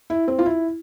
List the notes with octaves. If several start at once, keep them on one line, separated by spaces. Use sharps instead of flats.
E4
C4
F4
E4